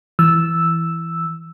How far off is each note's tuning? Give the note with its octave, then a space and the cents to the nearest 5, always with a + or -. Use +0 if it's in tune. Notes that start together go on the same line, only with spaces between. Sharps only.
E3 +0 E6 +0